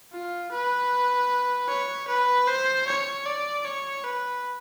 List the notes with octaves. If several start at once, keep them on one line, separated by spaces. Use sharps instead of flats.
F4
B4
C#5
B4
C5
C#5
D5
C#5
B4